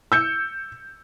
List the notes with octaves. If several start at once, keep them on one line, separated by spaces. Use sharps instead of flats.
E6 G6 C#7